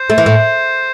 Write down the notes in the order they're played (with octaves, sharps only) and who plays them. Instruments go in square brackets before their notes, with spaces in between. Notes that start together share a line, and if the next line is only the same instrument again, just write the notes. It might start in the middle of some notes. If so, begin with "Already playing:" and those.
Already playing: [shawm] C5
[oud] A3
E3
A2